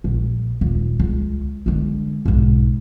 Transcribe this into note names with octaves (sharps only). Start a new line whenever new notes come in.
A#1
D#1
C#2
D3 G#3
B1 G#2